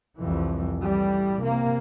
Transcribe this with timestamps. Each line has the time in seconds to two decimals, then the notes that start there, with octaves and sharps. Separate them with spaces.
0.19 C2 F2 E3
0.79 A2 E3 G3
1.40 C3 A#3